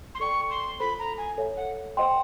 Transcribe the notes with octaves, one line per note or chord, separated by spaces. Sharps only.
C6
A4 D5 G5 C#6
C6
F4 A4 C5 B5
A#5
G#5
A4 C#5 E5
F#5
C5 D#5 F#5 G5 C6